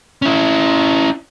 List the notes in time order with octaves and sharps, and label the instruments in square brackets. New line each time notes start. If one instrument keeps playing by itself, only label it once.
[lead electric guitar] C#4 E4